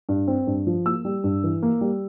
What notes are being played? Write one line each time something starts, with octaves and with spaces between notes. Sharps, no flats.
G2
C4
G2
F3
A#3 E6
G3
G2
E3
A#3
G3